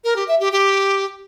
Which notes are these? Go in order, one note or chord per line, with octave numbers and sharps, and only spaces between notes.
A#4
G4
E5
G4
G4